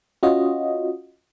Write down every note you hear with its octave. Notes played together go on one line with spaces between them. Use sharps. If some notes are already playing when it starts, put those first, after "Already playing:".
C#4 F4 F#4 D#5